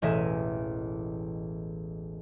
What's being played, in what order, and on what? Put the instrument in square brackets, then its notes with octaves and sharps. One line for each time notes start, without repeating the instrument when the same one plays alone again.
[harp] E1 A1 D#5 E5 G#5 E7